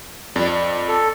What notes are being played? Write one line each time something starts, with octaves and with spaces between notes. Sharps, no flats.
F2 D5
A4